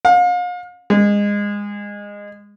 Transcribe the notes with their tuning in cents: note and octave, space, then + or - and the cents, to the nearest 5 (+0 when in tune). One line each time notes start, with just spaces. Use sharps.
F5 +40
G#3 -20